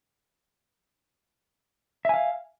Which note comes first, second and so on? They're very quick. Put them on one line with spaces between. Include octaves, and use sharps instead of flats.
E5 G#5 F5